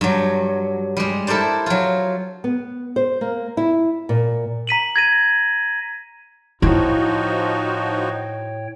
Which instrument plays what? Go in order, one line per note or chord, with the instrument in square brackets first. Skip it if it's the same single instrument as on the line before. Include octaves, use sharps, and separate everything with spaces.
[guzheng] G2 F#3
G3 G#3
E4 A4 A#4 C5 D5
F#3 F4
[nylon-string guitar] B3
C5
A#3
E4
A#2
[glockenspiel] A#5 B6 D#7 F#7
G#6 A#6 D#7
[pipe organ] A2 C#5 G5 [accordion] F3 D#4 F#4 [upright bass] E4